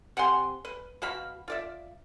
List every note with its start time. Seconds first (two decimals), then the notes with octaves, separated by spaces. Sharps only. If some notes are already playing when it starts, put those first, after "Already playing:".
0.17 C3 F#5 G#5 C6
0.65 B4
1.02 B2 F#4 F5 B5
1.48 F4 D5 E5